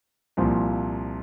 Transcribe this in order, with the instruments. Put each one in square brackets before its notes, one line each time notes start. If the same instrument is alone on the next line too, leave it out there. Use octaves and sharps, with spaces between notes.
[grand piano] C2 A#2 F3